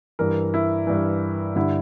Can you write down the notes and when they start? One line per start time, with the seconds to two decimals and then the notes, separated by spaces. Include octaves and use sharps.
0.19 G2 E3 A#4
0.54 E4
0.87 G2 E3
1.56 G2 D3 E4